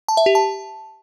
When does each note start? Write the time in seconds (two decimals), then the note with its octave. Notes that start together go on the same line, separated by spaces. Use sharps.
0.08 A5
0.17 E5
0.26 G4
0.35 A5